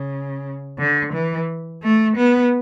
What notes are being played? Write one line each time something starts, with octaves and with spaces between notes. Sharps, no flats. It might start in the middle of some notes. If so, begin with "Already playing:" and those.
Already playing: C#3
D3
E3
A3
B3